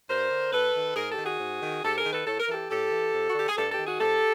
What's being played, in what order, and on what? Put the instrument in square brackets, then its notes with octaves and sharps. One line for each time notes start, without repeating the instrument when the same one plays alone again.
[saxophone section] G2 A#4 C5
D3
F#2 A4 B4
D#3
G#2 G#4 A#4
G4 A4
D#3
F#4 G#4
G#2
D#3
G#2 G4 A4
G#4 A#4
D#3
A4 B4
A2 A4
A#4
E3 G4 A4
A2 G4 A4
E3
F2
F#4
D3 G4
G#4
G2 G4 A4
G4 A4
D#3
F#4 G#4
F2 G4 A4